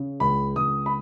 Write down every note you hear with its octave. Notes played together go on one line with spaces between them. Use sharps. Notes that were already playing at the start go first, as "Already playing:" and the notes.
Already playing: C#3
C#2 B5
C#2 D#6
B5